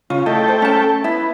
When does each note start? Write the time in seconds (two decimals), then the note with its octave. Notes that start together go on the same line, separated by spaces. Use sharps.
0.10 C#3 F4
0.26 A3 E4 A4 D#5 G5
0.48 C5
0.62 C#4 A5
1.04 B3 E4